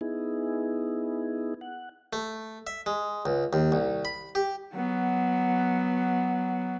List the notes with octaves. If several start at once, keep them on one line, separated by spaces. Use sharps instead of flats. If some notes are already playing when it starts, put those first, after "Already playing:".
B3 D#4 E4 G#4
F#5
A3
E5
G#3
C#2
D#2
C2
B5
G4
F#3 B3